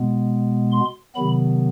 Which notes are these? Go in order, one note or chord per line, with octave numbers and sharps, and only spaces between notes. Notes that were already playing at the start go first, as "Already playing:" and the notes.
Already playing: B2 G#3 B3
C6
C3 D#3 F#3 B3 B5